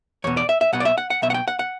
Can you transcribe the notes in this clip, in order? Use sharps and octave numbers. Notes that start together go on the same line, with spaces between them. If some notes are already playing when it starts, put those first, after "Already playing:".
E2 B2 C#5
D5
E5
E5
B1 B2 F#5
D5
E5
F#5
F#5
B1 B2 E5
F#5
G5
F#5
F#5